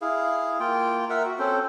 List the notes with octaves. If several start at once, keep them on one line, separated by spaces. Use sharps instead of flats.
E4 G#4 F5
A#3 F4 G5
A#4 E5 F#5
F#4
C4 C#4 A4 C5